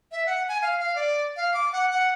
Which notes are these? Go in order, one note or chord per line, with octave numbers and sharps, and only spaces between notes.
E5
F#5
G#5
F5
F5
D5
F5
D6
F#5
F#5